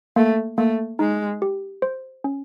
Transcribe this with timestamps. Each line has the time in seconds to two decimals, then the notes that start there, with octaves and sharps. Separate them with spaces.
0.16 A3 A#3
0.58 A3 A#3
0.99 G#3 D#4
1.42 G4
1.82 C5
2.24 C#4